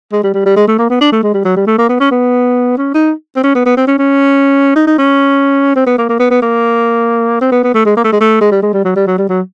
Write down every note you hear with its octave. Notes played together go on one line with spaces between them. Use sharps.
G#3
G3
G3
G3
G#3
A3
A#3
B3
D4
A3
G#3
G3
F#3
G3
A3
A#3
B3
C#4
B3
C#4
D#4
C4
C#4
B3
B3
C4
C#4
C#4
D#4
D#4
C#4
C4
B3
A#3
A#3
B3
B3
A#3
C4
B3
B3
A3
G#3
A#3
A3
G#3
A3
G#3
G3
G#3
G3
F#3
G3
F#3
G3
F#3